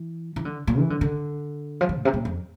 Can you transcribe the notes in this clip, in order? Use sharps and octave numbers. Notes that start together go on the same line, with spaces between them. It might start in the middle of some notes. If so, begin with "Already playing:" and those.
Already playing: E3
E3
D3
A#2
E3
D3
D3
F3
E3
A2
C3
A#2
F2